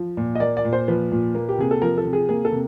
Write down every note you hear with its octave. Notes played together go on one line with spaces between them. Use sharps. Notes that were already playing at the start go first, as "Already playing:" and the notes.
Already playing: F3
A#2
D#5
A#3 D5
D5
A#2
C5
F3 B4
A#2
A#3
G4
C3 G#4
A4
F3 A#4
A4
C3
G#4
A#3 G#4
A4
C3